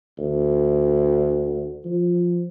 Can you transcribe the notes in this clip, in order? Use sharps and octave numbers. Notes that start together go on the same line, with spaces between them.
D2
F3